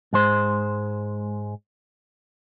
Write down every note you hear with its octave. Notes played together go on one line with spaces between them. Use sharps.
G#2 G#3 C5